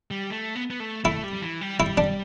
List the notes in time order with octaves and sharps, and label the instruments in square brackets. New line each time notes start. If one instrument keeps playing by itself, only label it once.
[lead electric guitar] G3
A3
B3
B3
A3
[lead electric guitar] A3 [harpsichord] E4
[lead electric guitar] G3
E3
G3
[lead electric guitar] G3 [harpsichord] E4
[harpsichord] D4